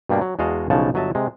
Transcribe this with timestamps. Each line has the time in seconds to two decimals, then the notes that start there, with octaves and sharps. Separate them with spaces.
0.09 G2 B2 G3 A#3 D4
0.21 F#3
0.39 E2 G#3 F#4 D#5 F5 A5
0.70 B1 C#3 F3 D4 C#5 A5
0.94 G1 F#3 D#5 E5 A5
1.15 C3 G#3